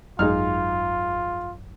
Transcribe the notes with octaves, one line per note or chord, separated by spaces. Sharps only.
G#1 F#2 G#3 D#4 F4 F6